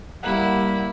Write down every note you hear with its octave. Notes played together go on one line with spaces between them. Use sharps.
G3 A#3 E4 F#5